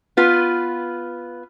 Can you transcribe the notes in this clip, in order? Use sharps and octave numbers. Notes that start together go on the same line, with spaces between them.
B3 F4 B4